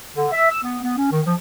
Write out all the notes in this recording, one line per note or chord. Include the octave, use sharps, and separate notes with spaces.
D3
E5
E6
B3
B3
C#4
D#3
F3